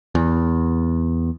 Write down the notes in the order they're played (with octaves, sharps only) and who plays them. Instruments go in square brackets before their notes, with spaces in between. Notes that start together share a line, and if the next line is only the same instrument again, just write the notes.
[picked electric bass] E2